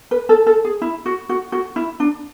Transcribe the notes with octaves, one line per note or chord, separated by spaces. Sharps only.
B4
A4
A4
G#4
E4
F#4
F#4
F#4
E4
D4